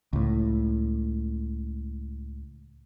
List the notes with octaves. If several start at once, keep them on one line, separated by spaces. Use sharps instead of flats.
C#2 A2